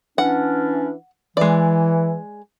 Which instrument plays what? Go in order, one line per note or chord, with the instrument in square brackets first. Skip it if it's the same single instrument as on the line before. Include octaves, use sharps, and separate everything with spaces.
[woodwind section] E3 C#4 D4 [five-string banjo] F#5
[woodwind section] E3 [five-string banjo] G#3 D5